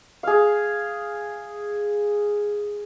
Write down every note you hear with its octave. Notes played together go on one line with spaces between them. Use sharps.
G#4 F5